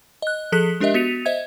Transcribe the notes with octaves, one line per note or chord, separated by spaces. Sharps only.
D#5 F#6
F3 G#4 A4 F#6 B6
G#3 D4 G4 A#4 D#5 E5
B3 F#4 B6 C#7 D#7 F7
C5 D#5 E5 G#6